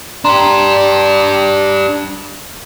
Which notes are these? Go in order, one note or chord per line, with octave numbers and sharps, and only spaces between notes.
D4 G4 A#5 C6